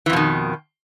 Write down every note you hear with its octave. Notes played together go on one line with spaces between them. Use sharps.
F2 B2 D#3 E3